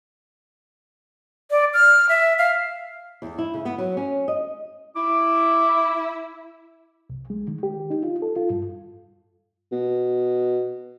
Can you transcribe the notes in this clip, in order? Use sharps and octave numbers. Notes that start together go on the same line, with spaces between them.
D5
F6
E5
F5
E2
E4
C#3
B3
F#3
C#4
D#5
E4 D6
C2
G#3
D#3
G4
D#4
F4
A4
F4
G2
B2